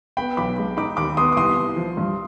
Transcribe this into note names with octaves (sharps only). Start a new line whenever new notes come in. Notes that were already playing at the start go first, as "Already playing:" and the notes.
B3 G5 B5
B1 B5 D6
G#3
D#4 B5 D6
D#2 B5 D6
B3 C6 D#6
D6
C2 C6 D#6
C2
F3
G2